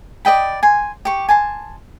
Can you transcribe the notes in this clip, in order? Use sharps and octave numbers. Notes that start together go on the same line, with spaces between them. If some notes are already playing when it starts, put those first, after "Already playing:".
D5 D#5 G5 B5
G#5 C6
G4 C#6
G#5 A5 C6